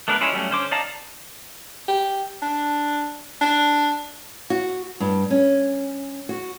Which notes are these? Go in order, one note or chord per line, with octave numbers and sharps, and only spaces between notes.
A3 B3 D4 A#4 B4
G#3 C#4 E4 F4
F#3 G3 A3 C#4
D3 C#4 C5 D6
D#4 D5 F5 A5 A#5
G4
D4
D4
F#4
G2
C#4
F#4